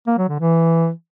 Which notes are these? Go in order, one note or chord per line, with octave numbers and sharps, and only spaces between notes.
A#3
F#3
D3
E3